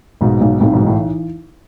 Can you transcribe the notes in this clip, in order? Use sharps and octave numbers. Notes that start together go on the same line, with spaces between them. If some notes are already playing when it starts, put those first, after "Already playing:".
B1 G#2 B2
B1
B1 A2 C3
G#2 B2
E3
A2